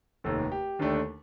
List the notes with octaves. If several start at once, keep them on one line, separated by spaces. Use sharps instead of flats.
F1 D#2 D#3 A4
G4
D#2 D3 A3 D4